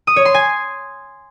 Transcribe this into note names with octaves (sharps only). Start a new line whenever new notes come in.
D#6
C#5
C6
G#5